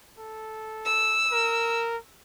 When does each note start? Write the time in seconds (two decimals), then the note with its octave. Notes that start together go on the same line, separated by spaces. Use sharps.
0.18 A4
0.85 E6
1.32 A#4